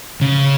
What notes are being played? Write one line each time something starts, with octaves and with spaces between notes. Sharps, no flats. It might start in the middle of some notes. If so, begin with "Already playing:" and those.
C#3